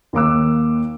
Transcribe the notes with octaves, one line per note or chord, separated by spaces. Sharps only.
D#2 A#3 D6 E6